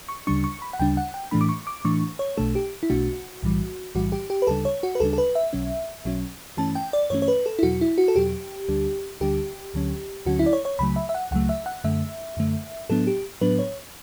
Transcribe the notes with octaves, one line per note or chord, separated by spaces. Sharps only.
C#6
D2 C#3 G3 D4 C#6
C#6
B5
F#5
D2 C#3 G3 D4 G5
F#5
G5
A2 E3 A3 D4 B5
D6
C#6
D6
A2 E3 A3 D4 C#6
C#5
B1 B2 A3 D4 A4
G4
E4
B1 B2 A3 D4 F#4
B1 A2 E3 G3
B1 A2 E3 G3 F#4
G4
G4
B4
D2 C#3 G3 D4 A4
C#5
F#4
B4
D2 C#3 G3 D4 A4
A4
B4
E5
B1 B2 F#3 C#4
B1 B2 F#3 C#4
G2 E3 A3 C#4 A5
G5
D5
G2 E3 A3 C#4 C#5
C#5
B4
A4
E4
E2 B2 F#3 F#4
E4
F#4
A4
E2 B2 F#3 G4
D2 D3 G3 D4
D2 D3 G3 D4 G4
D2 D3 F#3 C#4
D2 D3 F#3 C#4 F#4
E4
D5
C#5
C#5
C#2 C#3 F#3 A3 B5
E5
E5
F#5
C#2 C#3 F#3 A3 F#5
E5
F#5
F#2 D3 A3 E5
F#2 D3 A3
A2 F#3 B3 D4 A4
G4
A2 F#3 B3 D4 B4
C#5